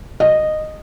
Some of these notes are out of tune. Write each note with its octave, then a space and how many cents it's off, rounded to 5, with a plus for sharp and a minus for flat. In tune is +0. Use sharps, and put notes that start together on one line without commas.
D#5 -10